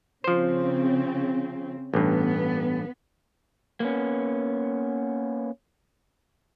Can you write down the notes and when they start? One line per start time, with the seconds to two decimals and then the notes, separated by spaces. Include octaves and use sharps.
0.24 C#3 F3 C4 C5
1.94 A1 G2 B3
3.80 A#3 B3 C#4